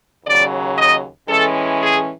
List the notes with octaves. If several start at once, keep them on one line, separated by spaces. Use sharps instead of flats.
D#2 C#3 F#3 D5
D#5
A2 E3 G#3 C#4 A4
G#4